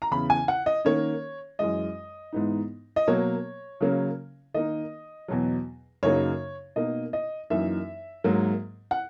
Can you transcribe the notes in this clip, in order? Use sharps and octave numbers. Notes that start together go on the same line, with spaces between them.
A#5
E2 C#3 E3 B5
G#5
F#5
D#5
D#3 A#3 C#4 C#5
F#2 E3 G#3 D#5
G#2 E3 B3 D#4
D#5
B2 F#3 A#3 C#5
C#3 F#3 A#3 C#4
D#3 A#3 D#4 D#5
E2 B2 F#3
F#2 C#3 F#3 A#3 D#4 C#5
B2 A#3 D#4 D#5
D#5
F#2 E3 A#3 D#4 E5
G#2 F#3 A#3
F#5